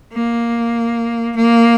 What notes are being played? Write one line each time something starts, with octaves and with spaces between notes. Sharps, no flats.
A#3
A#3